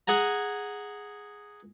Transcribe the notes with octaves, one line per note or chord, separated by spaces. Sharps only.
G#4 F#5 G#5 A#5